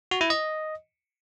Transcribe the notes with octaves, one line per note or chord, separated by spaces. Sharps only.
F#4
E4
D#5